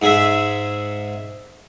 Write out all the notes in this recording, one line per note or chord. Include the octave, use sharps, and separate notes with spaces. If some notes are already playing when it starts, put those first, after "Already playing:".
G#2 G#4 E5